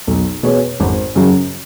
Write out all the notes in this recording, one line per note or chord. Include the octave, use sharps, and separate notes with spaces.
B1
B2 B3 G#4 C#5
G#1
F#2 C#3 F#3